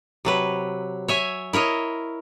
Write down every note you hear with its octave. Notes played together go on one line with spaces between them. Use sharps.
C3 F#3 B4
C#5 E5 G#5
E4 A#4 C#5 D#5